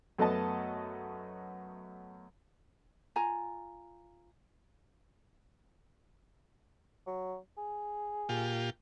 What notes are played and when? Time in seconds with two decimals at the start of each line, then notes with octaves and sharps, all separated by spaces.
0.19 F#2 A3 B3 D#5 A5
3.16 F4 G#5 A#5
7.07 F#3
7.58 G#4
8.29 A#2 F4 G4